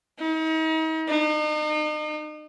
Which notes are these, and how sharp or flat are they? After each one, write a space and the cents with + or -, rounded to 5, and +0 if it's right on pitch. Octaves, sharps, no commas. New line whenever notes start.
D#4 +40
D#4 -40